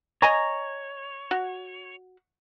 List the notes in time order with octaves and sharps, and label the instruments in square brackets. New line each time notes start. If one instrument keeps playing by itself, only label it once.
[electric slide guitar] C#5 [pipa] D#5 G#5 A#5
[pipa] F#4